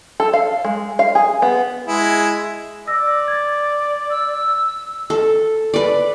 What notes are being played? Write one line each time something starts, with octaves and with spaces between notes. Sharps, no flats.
A4
F5
G#3
F5
G#4
B3
G#3 E4 G#4
D5 E6 A#6
G#6 A6
E6
A4
B4 D5